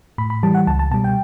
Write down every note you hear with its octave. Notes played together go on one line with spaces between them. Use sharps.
A2 B5
B5
E3 G3 A5
F#5
C#2 A5
A5
B2 G3 A5
G5